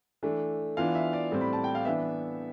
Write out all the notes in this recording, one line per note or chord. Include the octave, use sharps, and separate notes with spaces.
E3 A3 D4
E3 B3 D4 F4 F5
E5
D5
A2 G3 C4
B5
A5
G5
F5
E3 B3 D4 E5